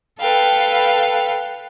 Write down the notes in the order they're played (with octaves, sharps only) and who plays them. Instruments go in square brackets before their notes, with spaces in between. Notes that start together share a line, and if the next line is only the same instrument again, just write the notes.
[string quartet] A4 B4 F5 G5